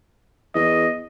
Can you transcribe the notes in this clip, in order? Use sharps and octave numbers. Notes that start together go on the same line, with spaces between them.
E2 D#5